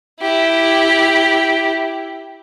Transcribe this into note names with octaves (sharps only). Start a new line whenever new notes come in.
E4 G4